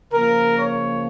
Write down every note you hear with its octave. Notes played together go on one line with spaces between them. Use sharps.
C#3 F3 A#3 A#4
C#5